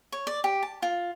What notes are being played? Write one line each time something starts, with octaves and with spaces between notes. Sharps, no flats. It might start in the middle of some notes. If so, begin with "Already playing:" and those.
C#5
D5
G4
A5
F4